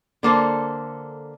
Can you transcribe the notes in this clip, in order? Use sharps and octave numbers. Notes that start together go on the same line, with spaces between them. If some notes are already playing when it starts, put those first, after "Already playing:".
D3 A#3 A4 C5